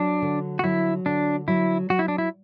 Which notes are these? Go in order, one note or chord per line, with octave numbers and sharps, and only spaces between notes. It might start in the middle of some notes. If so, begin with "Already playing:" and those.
Already playing: F#3 D4
D3
F#4
F#3 E4
D3 D4
F#3 E4
F#3 F#4
E4
D4
E4